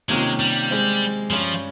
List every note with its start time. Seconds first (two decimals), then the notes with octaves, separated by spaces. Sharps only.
0.09 C3 D#3 G#3 A#3 C#4 F4
0.40 G3
0.70 G#3 C4 G4
1.31 G2 F3 G3 C#4